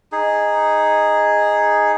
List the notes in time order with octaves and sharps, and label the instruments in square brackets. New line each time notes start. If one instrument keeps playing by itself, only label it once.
[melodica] D#4 G#4